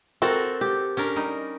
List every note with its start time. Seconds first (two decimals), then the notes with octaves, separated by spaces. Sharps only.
0.22 C4 F#4 A4 A#4
0.61 G4
0.97 C#4 D4 A#4
1.16 G3 D#4